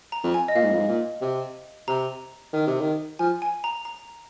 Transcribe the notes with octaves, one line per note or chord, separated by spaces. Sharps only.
A#5
F2
G#5
D#5
A#2 F5
G#2
F2
G#2
A#2
C3
C3 A#5
D#3
C3
D#3
F3 G#5
G#5
A#5
A#5